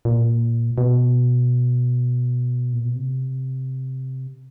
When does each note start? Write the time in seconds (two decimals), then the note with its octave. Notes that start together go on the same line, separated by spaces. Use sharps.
0.05 A#2
0.78 B2
2.73 A#2
2.85 B2
2.96 C3